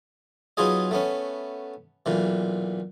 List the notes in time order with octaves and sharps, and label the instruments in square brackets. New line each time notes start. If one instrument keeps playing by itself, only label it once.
[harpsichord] F#3 B3 D#4 F4 G#4 D#5
A3 B3 C#4
B1 A#2 E3